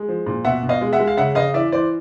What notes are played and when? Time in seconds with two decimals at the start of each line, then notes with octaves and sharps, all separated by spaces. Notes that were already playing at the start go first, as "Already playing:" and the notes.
Already playing: G#3
0.08 F3
0.26 A#2
0.45 B2 E5 F#5
0.63 B2
0.69 D#5 F5
0.81 G#3
0.93 E5 F#5
1.00 G#3
1.07 F5
1.17 C#3 E5 F#5
1.35 C#3 D#5 F5
1.54 E3 D5 E5
1.72 E3 C5 D5